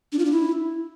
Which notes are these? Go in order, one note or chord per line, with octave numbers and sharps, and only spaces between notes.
D4
F4
D4
E4